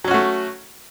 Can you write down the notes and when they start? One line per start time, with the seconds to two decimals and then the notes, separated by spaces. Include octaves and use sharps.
0.04 F#3
0.08 C#4
0.11 F#4
0.14 A3